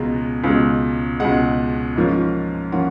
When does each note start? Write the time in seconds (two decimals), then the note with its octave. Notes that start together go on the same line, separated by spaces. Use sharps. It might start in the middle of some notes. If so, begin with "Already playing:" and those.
Already playing: C#2 B2 G#3 A#5
0.44 C#2 B2 G#3
1.20 C#2 B2 G#3 F#5
1.96 G#2 F3 A#3 C#4 F4
2.72 F3 A#3 C#4 F4 F#5